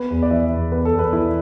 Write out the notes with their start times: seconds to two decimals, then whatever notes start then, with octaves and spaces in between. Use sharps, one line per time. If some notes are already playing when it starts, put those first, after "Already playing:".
Already playing: B3 B4
0.10 E2
0.23 D5
0.30 E3 E5
0.52 E2
0.72 B3 B4
0.85 A4
0.92 E2
0.99 B4
1.13 E3 E4